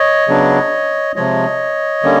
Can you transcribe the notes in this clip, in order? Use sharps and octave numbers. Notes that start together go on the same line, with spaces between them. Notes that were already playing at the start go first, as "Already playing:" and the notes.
Already playing: C#5 D#5
C#3 F#3 B3 D4
C3 F3 G#3 C#5 D#5
D3 G3 A#3 C#4